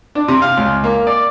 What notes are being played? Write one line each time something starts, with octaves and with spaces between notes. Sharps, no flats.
D4
C3
F5
C#2
A#3
D5